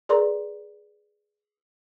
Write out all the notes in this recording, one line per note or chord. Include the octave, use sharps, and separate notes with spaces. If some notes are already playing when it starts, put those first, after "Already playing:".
G#4 A#4 B4 D5 A#5 C6